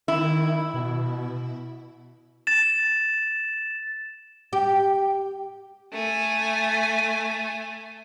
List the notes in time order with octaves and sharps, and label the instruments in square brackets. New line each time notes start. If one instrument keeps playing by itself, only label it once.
[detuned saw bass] D#3 [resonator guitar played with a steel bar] E4
[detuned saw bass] B2
[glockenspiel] A6 E7
[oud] G4
[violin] A3 G#5